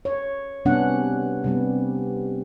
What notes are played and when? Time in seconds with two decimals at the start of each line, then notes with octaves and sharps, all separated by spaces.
0.05 C#5
0.65 C3 G3 B3 C#4 D4 F#5
1.44 C3 G3 B3